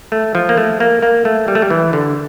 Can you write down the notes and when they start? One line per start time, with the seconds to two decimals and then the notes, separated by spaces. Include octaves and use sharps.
0.12 A3
0.35 F3
0.49 A#3
0.57 A3
0.80 A#3
1.03 A#3
1.25 A3
1.48 G3
1.55 A3
1.62 G3
1.70 E3
1.93 D3